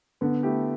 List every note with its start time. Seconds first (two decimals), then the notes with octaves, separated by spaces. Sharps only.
0.21 D3 B3
0.43 A3 E4 G4